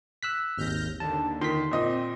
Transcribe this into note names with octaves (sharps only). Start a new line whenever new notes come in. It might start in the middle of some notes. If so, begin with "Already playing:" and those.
E6 F#6 B6
G#1 D#2 F6 G6 A#6
D#2 D3 A5
D#3 C6 B6
A#2 C4 D#5 D#6